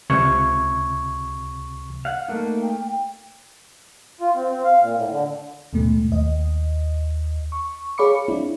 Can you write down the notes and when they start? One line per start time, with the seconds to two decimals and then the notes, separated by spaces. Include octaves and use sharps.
0.10 C#2 C3 C#6 G#6
2.05 F5 F#5
2.28 A3 A#3 D#4
2.63 G5
4.21 F4
4.35 C4
4.50 C4
4.64 F5
4.81 A#2
4.95 A2
5.09 D3
5.73 D#2 G#2 B2 A3
6.12 D#2 D#5
7.52 C#6
7.98 G#4 C#5 F5 B5 D6 C#7
8.28 C4 D4 E4